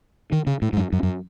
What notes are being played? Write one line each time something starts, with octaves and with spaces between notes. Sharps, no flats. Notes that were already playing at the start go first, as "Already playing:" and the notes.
D#3
C#3
A2
G#2
F#2
F#2
F#2